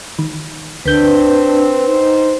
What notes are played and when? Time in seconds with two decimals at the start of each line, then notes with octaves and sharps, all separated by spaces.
0.19 D#3
0.85 D2 C4 D4 B4 G6
1.86 D#4 C5